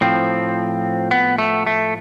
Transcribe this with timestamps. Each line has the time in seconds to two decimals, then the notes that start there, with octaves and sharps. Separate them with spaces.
0.01 A2 F3 C4
1.11 B3
1.38 A3
1.67 A3